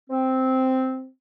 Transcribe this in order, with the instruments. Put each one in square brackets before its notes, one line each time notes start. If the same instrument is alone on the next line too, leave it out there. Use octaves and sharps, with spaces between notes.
[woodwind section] C4